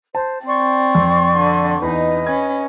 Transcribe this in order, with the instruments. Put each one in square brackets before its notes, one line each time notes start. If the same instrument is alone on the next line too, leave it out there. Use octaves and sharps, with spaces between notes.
[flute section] C5 [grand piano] A5
[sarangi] C4 [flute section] D5 C6 C#6
[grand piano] F2
[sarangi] D3
[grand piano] E2 [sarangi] D#4 [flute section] B4 D#5
[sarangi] C#4 [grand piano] G#6